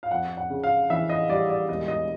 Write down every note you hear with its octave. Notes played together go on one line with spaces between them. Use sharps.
F5
F2 F#5
F#5
C#3
F5
E3 E5
D#5
G3 D5
D5
E1 D#5
D#5